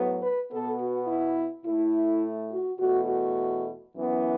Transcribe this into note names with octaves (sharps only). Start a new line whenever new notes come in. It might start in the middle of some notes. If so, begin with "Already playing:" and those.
Already playing: A2 F#3 B3
B4
B2 B3 A4
F#4
E4
A2 A3 E4
F#4
E2 B2 A3 F#4
F#4
F#2 E3 B3